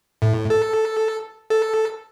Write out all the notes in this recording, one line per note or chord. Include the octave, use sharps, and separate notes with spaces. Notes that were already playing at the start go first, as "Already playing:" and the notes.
A2
A4
A4